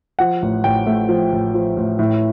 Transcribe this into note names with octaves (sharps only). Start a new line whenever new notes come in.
F3 F#5
A1
A1 G5
A3
F3
A1
F3
A1
A2